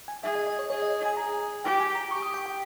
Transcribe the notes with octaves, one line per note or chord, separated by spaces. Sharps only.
G#5
G#4 E5
D#5
D#5
C#5
G#4 C#5
D#5
G#5
G#4 A#5
G4 G5
G#5
A#5
G4 C#6
D#6
G5
G5